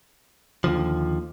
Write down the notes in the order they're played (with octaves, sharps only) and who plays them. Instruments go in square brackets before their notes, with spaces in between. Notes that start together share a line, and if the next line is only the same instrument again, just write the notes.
[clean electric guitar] D#2 D3 F3